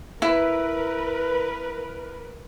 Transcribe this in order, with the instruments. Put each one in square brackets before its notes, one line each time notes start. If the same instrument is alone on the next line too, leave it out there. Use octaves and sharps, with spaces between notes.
[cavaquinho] E4 [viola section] A#4 B4